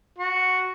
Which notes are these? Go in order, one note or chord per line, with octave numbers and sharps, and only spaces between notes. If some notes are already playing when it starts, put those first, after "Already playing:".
F#4